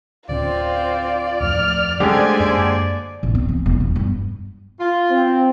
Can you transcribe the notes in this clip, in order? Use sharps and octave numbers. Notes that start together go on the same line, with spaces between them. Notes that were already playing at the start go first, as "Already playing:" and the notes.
D1 D3 C4 C#4 F4 D5
D1 F2 A2 F6
D3 F#3 G#3 A3 C#4 G4 C5 G#5
F#2 A#3 D5
A1
C4
E3
E1
E2
G2
F4
C4